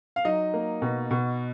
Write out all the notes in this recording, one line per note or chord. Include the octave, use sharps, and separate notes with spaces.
F5
F#3 D#4 D#5
A#3
B2
B2